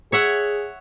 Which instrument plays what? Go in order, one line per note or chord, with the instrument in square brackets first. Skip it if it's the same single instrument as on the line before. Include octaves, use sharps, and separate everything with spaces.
[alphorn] G#4 [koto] C#5 E5 F#5